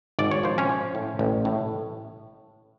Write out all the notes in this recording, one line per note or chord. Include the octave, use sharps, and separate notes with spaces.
G#1 D5
C#5
F3 C5
C#4 C#5
F3
A2
A1
A2